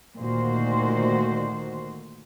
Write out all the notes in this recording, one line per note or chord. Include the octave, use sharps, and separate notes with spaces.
D2 A#2 D#3 F#4 C5